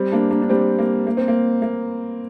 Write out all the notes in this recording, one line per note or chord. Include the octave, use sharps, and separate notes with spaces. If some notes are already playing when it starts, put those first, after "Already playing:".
Already playing: G3 C4
A#3 D4
A#3 D4
D4
G3 C4
A#3
A#3
C4
A#3
A#3